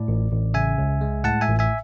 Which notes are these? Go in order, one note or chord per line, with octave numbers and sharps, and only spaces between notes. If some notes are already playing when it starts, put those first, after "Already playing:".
Already playing: A2 D5
A1
A1
C#3 E5 G#5
C#2
G#3
A2 F#5 A5
E5 G#5
A1
E5 G#5